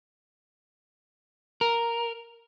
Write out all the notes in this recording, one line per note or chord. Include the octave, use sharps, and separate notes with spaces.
A#4